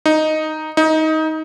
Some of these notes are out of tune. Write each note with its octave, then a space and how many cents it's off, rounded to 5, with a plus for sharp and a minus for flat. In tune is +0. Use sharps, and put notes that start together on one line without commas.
D#4 +0
D#4 +20